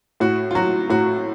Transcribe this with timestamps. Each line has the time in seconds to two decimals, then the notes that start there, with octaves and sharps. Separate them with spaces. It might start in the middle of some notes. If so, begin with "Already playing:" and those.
0.20 A2 F#4
0.51 F4
0.55 F#3 F#4
0.90 A2 F#4